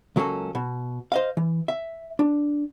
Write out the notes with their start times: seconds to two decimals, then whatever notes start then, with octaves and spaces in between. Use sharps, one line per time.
0.16 C#2 F#3 A#3 C#4 A4
0.55 B2
1.12 C5 D#5 F5
1.37 E3
1.68 E5
2.19 D4